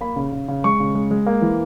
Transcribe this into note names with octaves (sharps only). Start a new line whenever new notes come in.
A#3 B5
C#3
C#3
C#3
G#3 C#6
C#3
G#3
G#3
A#3
E3